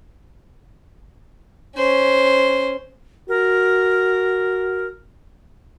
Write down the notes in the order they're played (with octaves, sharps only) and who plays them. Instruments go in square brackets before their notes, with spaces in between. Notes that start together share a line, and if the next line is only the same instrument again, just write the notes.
[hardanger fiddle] C#4 C5
[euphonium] F#4 [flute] A#4